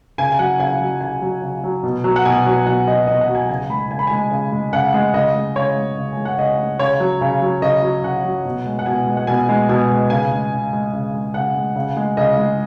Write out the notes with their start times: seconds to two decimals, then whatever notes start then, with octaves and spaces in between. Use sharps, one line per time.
0.18 C#3 G#5
0.32 G#5
0.39 F#3 F#5
0.60 C#3 G#5
0.81 F#3
1.01 C#3 G#5
1.22 F#3
1.42 C#3
1.64 F#3
1.83 B2
2.04 F#3
2.16 F#5
2.25 B2 G#5
2.46 F#3
2.66 B2 F#5
2.87 F#3 D#5
3.07 B2 D#5
3.21 F#5
3.29 F#3
3.35 G#5
3.49 C#3 G#5
3.69 G#3 B5
3.91 C#3 G#5
3.99 B5
4.07 G#3 G#5
4.31 C#3
4.52 G#3
4.73 C#3 F#5
4.94 G#3
5.14 C#3 D#5
5.35 G#3
5.56 C#3 C#5
5.76 G#3
5.97 C#3
6.12 G#3 G#5
6.25 F#5
6.38 C#3 D#5
6.59 G#3
6.79 C#3 C#5
7.00 F#3
7.21 C#3
7.42 F#3
7.62 C#3 D#5
7.83 F#3
8.04 C#3 F#5
8.25 F#3
8.45 B2
8.66 G#3
8.79 F#5
8.86 B2 G#5
9.07 G#3
9.17 F#5
9.27 B2 G#5
9.49 G#3
9.69 B2 G#5
9.90 G#3
10.10 C#3 G#5
10.30 G#3
10.52 C#3
10.73 G#3
10.93 C#3
11.14 G#3
11.34 C#3 F#5
11.55 G#3
11.76 C#3
11.97 G#3
12.17 C#3 D#5
12.38 G#3